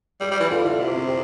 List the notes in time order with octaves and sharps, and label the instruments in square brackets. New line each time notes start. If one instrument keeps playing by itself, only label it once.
[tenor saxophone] G3 [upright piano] G4
[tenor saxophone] G3
E3
[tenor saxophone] D3 [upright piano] F4
[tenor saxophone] D3 [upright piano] E4
[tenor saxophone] C3
[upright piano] C4
G4